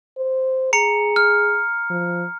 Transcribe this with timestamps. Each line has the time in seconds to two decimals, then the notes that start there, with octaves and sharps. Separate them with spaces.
0.17 C5
0.73 G#4 A#5 C#7
1.16 F6
1.90 F3